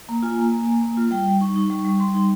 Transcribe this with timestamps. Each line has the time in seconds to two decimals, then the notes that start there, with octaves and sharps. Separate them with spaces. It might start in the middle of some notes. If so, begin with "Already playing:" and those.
0.09 A#3
0.23 F4 G#5
0.38 A#3
0.52 A#3 G#5
0.67 A#3
0.81 A#3
0.97 F4
1.11 G3 G5
1.27 G3
1.41 D#4 C#6
1.56 D#4
1.70 G3 C#6
1.85 G3
2.00 G3 C6
2.15 D#4